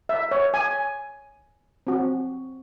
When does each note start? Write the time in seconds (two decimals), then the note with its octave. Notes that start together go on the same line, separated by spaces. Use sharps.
0.09 E5
0.31 C#5
0.54 G#5
1.87 C4 F#4